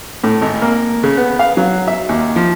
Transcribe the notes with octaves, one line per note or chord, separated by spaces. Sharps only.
A2
G#1
A#3
C#3
B3
F5
F#3
E5
D#2
F3